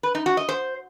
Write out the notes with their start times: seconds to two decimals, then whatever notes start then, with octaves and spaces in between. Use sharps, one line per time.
0.03 B4
0.15 D#4
0.26 F#4
0.37 D#5
0.49 C5